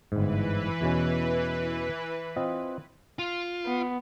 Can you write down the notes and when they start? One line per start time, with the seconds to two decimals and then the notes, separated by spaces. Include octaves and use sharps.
0.12 G1 G#2 E3 B4
0.81 E2 B2 C#4
2.36 C4 F4 D#5
3.19 F4
3.66 B3